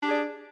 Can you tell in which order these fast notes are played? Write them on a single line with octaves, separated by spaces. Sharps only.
D4 G4 G#4 D5